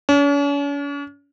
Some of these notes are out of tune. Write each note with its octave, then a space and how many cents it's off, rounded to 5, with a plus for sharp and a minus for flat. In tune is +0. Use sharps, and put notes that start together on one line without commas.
C#4 +45